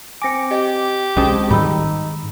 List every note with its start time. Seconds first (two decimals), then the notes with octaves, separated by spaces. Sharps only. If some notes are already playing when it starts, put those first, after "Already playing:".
0.22 C4 G#5 D6 A#6 C#7
0.51 G4 D#5
1.16 B1 G#3 C4 C#4 F#4 G5 A5 D#6
1.51 G#2 D#3 G3 D#4 B5 E6